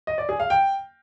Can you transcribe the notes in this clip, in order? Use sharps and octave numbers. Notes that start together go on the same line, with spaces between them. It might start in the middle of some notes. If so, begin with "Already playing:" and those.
D#5
D5
G#4
F5
G5